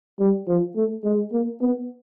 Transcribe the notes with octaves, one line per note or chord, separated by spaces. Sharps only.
G3
F3
A3
G#3
A#3
B3